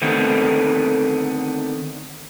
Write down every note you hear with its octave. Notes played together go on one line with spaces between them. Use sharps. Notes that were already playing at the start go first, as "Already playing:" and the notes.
D3 D#3 A3 B3 C4 D#4